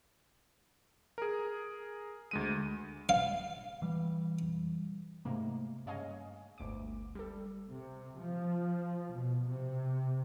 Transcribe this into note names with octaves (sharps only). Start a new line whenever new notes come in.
G#4 A#4
D2 G#3 D#7
F5
E3 G3
G#2 C3 A3 A#3
G2 C#3 C#5 D#5 F5 G#5
G1 D2 D6
G3 A4
C3
F3
B2
C3